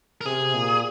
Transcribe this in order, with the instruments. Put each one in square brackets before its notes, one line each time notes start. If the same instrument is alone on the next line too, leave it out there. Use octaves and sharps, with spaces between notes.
[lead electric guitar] A#4
[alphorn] C3 [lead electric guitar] G#4
[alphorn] A#2